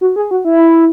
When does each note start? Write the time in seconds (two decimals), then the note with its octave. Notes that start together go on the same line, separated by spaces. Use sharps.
0.01 F#4
0.16 G#4
0.31 F#4
0.45 E4